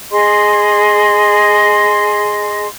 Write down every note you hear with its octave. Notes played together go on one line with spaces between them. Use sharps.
G#4 D#5 C6